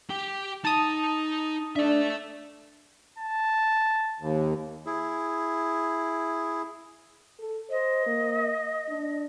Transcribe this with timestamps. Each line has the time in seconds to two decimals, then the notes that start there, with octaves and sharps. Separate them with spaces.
0.10 G4 G5
0.65 D#4 D#5 A5 D#6
1.76 D4 A4 E5
3.18 A5
4.20 D#2
4.86 E4 G#4
7.39 A4
7.70 C5 D#5
8.06 A#3
8.89 D4